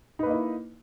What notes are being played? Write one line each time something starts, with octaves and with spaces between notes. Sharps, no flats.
A#3 D#4 E4 B4 D#5